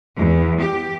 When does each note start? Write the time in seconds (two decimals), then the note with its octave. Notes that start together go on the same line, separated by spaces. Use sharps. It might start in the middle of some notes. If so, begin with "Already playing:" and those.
0.17 E2
0.59 G4